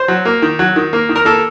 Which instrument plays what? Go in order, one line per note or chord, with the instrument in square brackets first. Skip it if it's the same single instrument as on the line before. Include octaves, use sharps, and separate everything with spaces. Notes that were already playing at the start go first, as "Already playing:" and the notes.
Already playing: [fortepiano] C5
F#3
A#3
D#3
F#3
D#3
A#3
D#3
A#4
A#3 A4